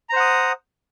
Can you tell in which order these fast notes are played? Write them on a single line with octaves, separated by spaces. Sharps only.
A#5 C5 F#5 D#6